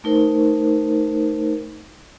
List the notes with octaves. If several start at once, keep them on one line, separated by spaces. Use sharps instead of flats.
A3 D#4 A#4 C5